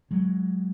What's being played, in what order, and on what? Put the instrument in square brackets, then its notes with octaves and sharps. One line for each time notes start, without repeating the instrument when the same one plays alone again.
[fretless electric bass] F#3 G#3